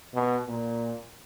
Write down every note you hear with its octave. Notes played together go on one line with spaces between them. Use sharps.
B2
A#2